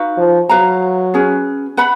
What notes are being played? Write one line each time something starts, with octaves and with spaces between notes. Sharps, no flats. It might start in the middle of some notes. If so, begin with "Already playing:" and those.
Already playing: D#4 F#4 B4 F5
F3
F#3 B4 F5 A#5
C#4 G#4 B4
B4 F#5 B5